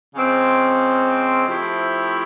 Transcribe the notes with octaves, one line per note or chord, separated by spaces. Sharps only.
C#3 F3 G#3 C4
F3 A3 C4 E4 G4